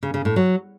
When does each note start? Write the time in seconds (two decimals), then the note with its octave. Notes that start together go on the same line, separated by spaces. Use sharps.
0.03 C#3
0.14 C#3
0.25 A2
0.36 F#3